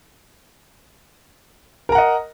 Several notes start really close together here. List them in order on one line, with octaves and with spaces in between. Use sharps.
A#4 A#5 F#5 D#5